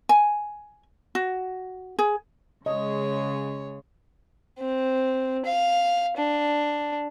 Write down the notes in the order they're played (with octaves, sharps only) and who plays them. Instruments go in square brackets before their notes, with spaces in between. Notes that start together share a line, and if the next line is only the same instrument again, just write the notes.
[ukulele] G#5
F#4
G#4
[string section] C#3 G#3 [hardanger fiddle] C#5 [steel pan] D#5
[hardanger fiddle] C4
F5
D4